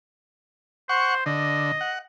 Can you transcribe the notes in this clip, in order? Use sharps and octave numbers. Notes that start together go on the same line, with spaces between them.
C5 F#5 C#6
D3 D#5
F#5